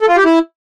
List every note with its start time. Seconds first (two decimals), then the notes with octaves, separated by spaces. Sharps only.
0.01 A4
0.09 F4
0.17 G4
0.25 E4